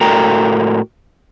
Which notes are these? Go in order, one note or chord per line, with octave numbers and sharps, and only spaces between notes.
A2 F#4 A4 A#4 G5 A#5